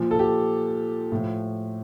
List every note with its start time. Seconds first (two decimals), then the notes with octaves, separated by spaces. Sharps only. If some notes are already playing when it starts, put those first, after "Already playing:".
Already playing: A#2 F3
0.11 A4
0.19 G4
1.12 A2 F3